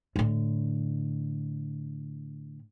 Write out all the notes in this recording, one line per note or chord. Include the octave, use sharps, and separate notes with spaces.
A2 D3